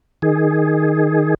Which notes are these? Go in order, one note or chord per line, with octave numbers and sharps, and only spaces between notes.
D#3 G#4